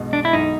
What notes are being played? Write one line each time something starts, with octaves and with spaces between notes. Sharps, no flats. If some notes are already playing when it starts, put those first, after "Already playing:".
Already playing: B1 B2 G#3
D4
E4
B1 D#4